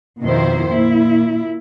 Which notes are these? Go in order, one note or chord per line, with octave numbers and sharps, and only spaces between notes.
F2 B2 D#3 E4 C5
A#2 E4